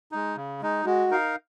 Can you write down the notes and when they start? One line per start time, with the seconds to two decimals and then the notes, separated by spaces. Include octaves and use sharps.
0.12 G#3 D#4
0.37 C#3
0.62 G#3 D#4
0.86 G#3 F#4
1.11 D#4 A#4 F5